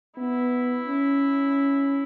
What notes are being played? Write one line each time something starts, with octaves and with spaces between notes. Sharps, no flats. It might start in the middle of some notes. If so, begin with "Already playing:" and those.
B3 E4
C#4